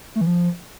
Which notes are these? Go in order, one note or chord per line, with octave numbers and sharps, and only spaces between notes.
A3
E3
F3